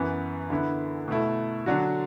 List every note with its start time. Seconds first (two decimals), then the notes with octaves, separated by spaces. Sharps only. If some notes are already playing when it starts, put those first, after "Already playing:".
Already playing: F#2 E3 B3
0.50 D3 B3 E4
1.08 B2 A3 E4
1.66 D3 F#3 D4 F#4